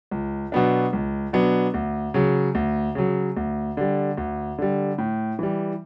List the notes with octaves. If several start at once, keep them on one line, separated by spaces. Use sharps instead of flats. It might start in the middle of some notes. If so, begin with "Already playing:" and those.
C#2
B2 F#3 B3 D4
C#2
B2 F#3 B3 D4
D2
C#3 F#3
D2
C#3 F#3
D2
D3 G3
D2
D3 G3
A2
E3 G3